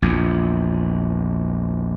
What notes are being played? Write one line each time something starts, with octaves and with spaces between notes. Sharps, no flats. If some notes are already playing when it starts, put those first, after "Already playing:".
A#1 E2